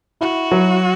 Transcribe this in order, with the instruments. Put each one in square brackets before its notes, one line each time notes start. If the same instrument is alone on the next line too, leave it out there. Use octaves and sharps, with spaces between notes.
[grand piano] E4 [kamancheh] F#4
[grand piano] F#3